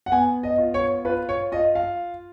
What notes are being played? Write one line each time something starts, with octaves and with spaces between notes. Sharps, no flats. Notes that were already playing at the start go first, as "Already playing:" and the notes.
F#5
B3 G#5
D#5
F4
C#5
F4 B4
C#5
F4 D#5
F5